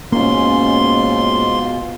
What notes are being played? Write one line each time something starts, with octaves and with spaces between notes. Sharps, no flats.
G#2 B2 A#3 C#4 F4 C6